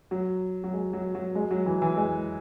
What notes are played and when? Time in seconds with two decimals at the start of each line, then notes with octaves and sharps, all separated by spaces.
0.11 F#3
0.64 F#3
0.73 G#3
0.93 F#3
1.15 F#3
1.35 G#3
1.51 F#3
1.66 E3
1.82 E3
1.96 G#3